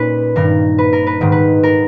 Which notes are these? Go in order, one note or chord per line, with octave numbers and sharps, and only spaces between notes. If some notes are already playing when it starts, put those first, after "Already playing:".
Already playing: A#2 C#4 D#4 B4
G2 D#3 A#4
B4
A#4
B4
G#2 D#3
B4
A#4